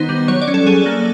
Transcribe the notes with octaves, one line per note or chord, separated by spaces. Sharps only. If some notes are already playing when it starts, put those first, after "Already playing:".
Already playing: D#3 B3 D#4 C5
G3
F#3 C#5
D5
C#4
A4
F#3 G#4
A#3